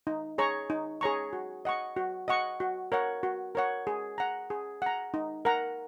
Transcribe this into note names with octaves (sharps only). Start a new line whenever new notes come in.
D#4
G#4 C#5 A#5 C#6
D#4
G#4 C#5 A#5 C#6
F#4
D#5 F#5 C#6
F#4
D#5 F#5 C#6
F#4
A#4 C#5 F#5
F#4
A#4 C#5 F#5
G#4
F#5 A#5
G#4
F#5 A#5
D#4
A#4 F#5 A#5